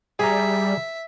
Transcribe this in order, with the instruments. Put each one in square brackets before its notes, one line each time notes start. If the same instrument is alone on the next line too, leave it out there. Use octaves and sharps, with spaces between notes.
[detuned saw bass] G3 [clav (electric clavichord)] G#4 A#5 [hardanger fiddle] E5